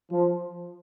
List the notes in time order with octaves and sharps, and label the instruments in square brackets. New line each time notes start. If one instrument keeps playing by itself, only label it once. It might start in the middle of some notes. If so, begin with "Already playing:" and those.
[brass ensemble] F3